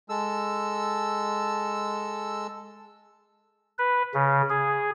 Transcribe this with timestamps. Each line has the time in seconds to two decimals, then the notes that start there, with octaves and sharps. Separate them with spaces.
0.09 G#3 A4 E6
3.79 B4
4.14 C#3
4.50 G#4